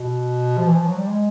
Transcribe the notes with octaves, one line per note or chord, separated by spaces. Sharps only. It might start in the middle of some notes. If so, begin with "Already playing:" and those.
Already playing: B2
F3
E3
F3
F#3
G3
G#3